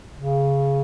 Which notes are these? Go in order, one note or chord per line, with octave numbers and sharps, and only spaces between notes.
C#3